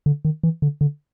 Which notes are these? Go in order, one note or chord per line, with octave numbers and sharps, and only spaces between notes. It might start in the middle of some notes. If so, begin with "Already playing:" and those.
D3
D#3
E3
D3
D3